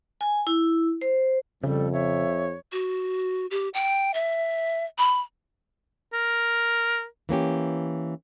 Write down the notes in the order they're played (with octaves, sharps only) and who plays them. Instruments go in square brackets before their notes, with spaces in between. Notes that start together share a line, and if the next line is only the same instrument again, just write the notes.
[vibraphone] G#5
E4
C5
[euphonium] F2 [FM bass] C#3 [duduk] G3 [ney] A4
[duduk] C#5 [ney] E5
[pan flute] F#4
G4
G5
E5
B5
[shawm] A#4
[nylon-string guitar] E3 A#3 C#4 G4